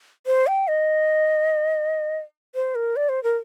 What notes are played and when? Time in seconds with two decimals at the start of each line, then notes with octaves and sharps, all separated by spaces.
0.27 C5
0.47 G5
0.68 D#5
2.55 C5
2.75 A#4
2.96 D5
3.09 C5
3.23 A#4